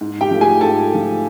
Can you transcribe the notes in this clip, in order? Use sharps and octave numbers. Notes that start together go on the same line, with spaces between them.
G#2
G4 G5
F3 A3
G#4 G#5
G#2 A4 A5
F3 A3